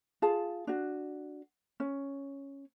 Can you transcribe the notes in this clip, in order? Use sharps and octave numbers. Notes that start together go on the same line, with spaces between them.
F4 G#4 A5
D4 F#4
C#4